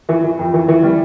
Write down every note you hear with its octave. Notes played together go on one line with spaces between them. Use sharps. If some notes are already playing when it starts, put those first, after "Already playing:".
E3
E3
F2
E3
E3
G3